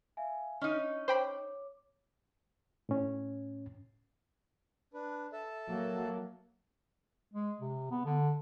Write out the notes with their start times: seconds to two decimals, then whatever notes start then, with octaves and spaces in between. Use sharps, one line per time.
0.17 E5 F5 G#5
0.61 C#4 D#4 D#5
1.08 C5 C#5 G5 B5 D6
2.89 A2 C#4
4.94 D4 B4
5.33 A4 E5 A5
5.69 F#3 A#3
7.32 G#3
7.60 C3
7.91 B3
8.06 D3